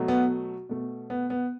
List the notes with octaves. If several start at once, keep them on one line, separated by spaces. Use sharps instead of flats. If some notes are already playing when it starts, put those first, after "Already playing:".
Already playing: B2 F#3 A3
B3
B2 A3
B3
B3